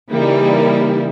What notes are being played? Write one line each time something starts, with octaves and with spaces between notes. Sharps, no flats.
C#3 E3 G3 A#3 D#4 E4